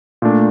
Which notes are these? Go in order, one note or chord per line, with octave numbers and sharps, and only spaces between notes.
A#2 A3 D4